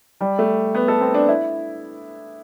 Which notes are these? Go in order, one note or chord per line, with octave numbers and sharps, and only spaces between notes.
G3
A3
B3
A4
C4
D4
E4